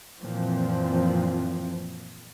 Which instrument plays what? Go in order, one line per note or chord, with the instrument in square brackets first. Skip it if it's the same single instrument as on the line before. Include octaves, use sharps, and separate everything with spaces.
[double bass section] F#2 A#2 E3 F3 C4